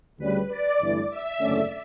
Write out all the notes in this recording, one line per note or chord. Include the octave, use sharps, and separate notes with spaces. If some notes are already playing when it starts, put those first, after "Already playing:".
D2 C#3 G3 B4
D5
G1 G2 E3 A3 E4
E5
F#1 E2 D3 A3 C#4 D5